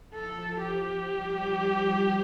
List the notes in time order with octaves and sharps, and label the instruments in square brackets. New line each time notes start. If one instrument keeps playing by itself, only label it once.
[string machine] F3 [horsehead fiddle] A4
[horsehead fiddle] G4
[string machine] G3
F3